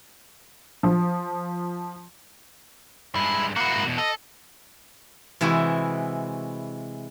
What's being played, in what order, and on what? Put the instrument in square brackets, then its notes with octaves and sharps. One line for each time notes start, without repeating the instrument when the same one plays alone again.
[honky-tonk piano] F3
[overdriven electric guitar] G2 G#3 [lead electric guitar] E4
[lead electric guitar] A#3 E4 [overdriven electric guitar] F#4 F#5
[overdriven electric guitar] G#2 F#4
E2 B2
[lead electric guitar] A4 [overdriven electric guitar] D#5
[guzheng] C3 E3 G#3 E4 F#4